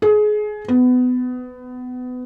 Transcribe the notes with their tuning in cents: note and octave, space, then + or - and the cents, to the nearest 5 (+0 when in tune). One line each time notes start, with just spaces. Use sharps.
G#4 +25
B3 +25